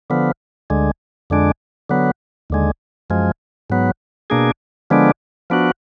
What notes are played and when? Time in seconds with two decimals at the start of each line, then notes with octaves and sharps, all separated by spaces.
0.10 D3 F3 B3
0.70 D2 D3 G#3
1.30 F2 D3 G#3 D4
1.90 D3 F#3 B3
2.50 D#2 D3 G#3
3.10 F#2 F3 G#3
3.70 G#2 F#3 B3
4.30 B2 A#3 D4 G#4
4.90 D3 F3 G#3 B3 D4
5.50 F3 B3 D4 F#4